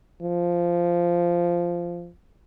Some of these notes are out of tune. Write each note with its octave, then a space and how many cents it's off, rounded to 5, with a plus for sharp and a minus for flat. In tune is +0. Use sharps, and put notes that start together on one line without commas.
F3 -10